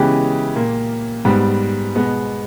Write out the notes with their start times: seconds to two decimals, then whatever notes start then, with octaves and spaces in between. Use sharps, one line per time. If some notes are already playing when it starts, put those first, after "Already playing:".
Already playing: C#3 E3 G#3 B3 G4
0.55 A#2 A#3
1.25 G#2 G3 B3
1.95 B2 G#3 B3